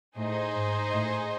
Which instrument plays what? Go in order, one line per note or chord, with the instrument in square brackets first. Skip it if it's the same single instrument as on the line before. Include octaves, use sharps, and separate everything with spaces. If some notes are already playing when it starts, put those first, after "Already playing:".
[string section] A2 [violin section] D#4 G#4 C5 D#5
[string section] G#2
A2